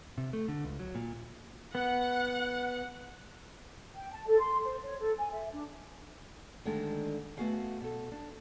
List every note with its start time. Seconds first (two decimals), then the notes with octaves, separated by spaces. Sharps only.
0.18 C3
0.33 A3
0.48 D3
0.64 C#2
0.79 F#3
0.95 A#2
1.75 B3 F#5
3.94 G5
4.12 A5
4.27 A4
4.39 C6
4.64 C5
4.82 C#5
5.00 A4
5.18 G#5
5.31 E5
5.51 D4
6.65 D3 D#3 G#3 A3 D4 G4
7.37 A3 B3 F#4 G#4 F5 F#5
7.80 B2 A4
8.12 D4